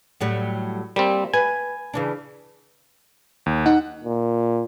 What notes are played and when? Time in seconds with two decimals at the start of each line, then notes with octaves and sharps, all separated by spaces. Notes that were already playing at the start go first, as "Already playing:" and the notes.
0.20 A2 F#3 G3
0.96 G3 A#3 C4
1.34 B4 G#5
1.94 C#3 E3 D4
3.46 D#2
3.66 D#4 F#5
4.04 A#2